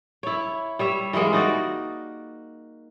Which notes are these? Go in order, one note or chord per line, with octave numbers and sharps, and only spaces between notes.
E4 C#5
G3 C#5 E5
E3 G3 G#3 A#3
D#4 F#4 D5